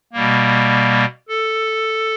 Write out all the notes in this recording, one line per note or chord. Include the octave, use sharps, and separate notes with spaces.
B2 G3 A#3
A4